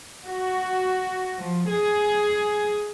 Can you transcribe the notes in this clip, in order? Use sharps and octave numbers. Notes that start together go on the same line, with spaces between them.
F#4
F3
G#4